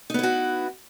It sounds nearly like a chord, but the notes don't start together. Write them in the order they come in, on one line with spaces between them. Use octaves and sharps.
D#4 B3 E4 F#4